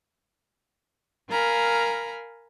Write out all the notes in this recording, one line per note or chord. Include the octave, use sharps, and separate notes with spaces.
A#4 F5 G#5 A#5 B5